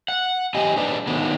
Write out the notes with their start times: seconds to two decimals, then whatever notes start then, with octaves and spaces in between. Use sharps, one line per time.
0.08 F#5
0.54 C4 G4 D#5 G#5
0.76 D4 G#4 B4 D5
1.07 D3 D#3 F#3 G#3 B3 D4